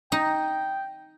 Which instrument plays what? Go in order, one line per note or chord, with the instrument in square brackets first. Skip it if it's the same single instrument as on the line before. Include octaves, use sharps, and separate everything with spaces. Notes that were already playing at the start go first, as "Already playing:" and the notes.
[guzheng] D#4 [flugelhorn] G5